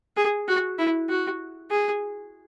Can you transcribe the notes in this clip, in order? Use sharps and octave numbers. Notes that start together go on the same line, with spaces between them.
G#4
F#4
E4
F#4
G#4